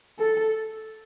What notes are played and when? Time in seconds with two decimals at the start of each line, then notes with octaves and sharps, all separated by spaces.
0.19 A4